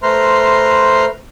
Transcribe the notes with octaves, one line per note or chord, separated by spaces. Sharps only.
A3 B4 C5 A#5 C6 F6